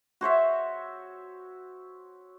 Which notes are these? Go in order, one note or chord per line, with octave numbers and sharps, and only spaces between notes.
F#4 C5 C#5 E5